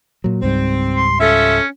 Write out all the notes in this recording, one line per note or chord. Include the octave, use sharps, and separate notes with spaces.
A#2 F#3
C#2 G#2 G3 C4
C6
C#4 F4 A4 E5